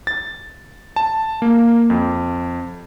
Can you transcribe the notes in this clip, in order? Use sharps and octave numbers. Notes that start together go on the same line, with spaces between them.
A6
A5
A#3
F2